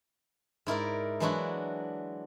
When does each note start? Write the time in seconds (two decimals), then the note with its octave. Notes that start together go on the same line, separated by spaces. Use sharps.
0.67 G#2 E4 A#4 D5
1.20 E3 F#3 G#3 D4 E4 F#4